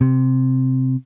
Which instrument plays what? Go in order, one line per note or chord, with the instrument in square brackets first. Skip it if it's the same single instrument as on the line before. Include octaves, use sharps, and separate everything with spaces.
[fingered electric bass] C3